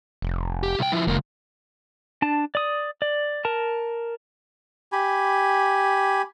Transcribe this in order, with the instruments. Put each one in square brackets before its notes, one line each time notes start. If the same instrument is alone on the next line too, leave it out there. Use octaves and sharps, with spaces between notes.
[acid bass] F1
[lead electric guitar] G4
C2 G5
F3 E4
[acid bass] F1 [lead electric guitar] C#2 A#3
[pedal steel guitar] D4 A5
D5 D#6
D5
A#4 A5
[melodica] G4 G#5 B5